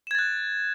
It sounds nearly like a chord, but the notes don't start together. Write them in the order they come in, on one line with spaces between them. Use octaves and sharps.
E7 G#6 A6 F#6